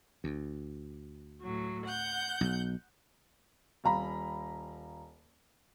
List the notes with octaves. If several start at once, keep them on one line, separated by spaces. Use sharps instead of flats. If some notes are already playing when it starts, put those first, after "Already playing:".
D2
A2 F#3
F#5 G6
B1
D#1 F5 A#5 B5